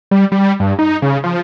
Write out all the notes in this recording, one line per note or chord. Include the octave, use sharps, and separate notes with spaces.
G3
G3
G2
D#4
C#3
F3